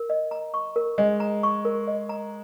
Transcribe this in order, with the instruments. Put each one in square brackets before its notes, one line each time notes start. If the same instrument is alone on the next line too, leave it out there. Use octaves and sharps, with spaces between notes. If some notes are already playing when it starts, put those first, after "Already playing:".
Already playing: [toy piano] A#4
D#5
A#5
C#6
A#4
[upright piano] G#3 [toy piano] D#5
[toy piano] A#5
C#6
A#4
D#5
A#5